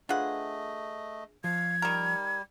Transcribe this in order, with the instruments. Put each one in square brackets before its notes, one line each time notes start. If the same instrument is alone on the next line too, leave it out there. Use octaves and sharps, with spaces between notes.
[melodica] A3 D#5 [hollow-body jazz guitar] D4 G#4 B4 [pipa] F4 F#5
[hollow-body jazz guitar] F3 [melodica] F5 [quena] G#6
[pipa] D#3 A#4 [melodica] G3